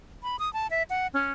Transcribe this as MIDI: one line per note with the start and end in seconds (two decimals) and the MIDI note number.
0.23 0.36 83
0.39 0.52 87
0.53 0.67 81
0.71 0.83 76
0.90 1.07 78
1.14 1.32 61